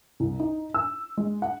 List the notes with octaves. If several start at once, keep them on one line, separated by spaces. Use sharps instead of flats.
C2
D#4
E6
G#3
F#5